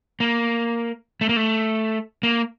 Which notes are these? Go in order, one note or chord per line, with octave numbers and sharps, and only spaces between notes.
A#3
A3
A#3
A3
A#3